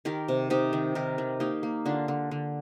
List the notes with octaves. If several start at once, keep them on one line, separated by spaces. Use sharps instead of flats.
D#3 G4 A#4
C3
C3 D#4 G4
D#3
D#3 G4 A#4
D#3
A#3 D#4 G4
A#3
D3 D4 F4
D3
D3